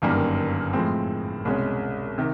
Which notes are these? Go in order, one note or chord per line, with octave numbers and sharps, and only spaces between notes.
G1 F#2 D#3 G3 A#3
A2 F3 G#3 C4
C2 B2 G#3 C#4
C3 D#3